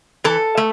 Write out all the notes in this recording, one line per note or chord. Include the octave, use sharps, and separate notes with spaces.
E3 A4
A3